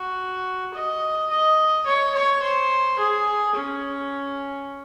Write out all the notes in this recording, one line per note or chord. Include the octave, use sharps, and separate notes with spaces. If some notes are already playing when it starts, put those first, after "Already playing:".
Already playing: F#4
D#5
D#5
C#5
C#5
C5
G#4
C#4